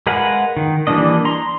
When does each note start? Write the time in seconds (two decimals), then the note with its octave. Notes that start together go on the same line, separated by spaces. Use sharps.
0.07 G#3 A#4 B4 F5 F#5
0.57 D#3
0.87 E3 G3 A#3 D4 D#5
1.25 A#5 C6